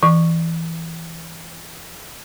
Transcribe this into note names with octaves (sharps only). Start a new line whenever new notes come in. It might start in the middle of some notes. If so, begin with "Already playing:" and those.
E3 C#6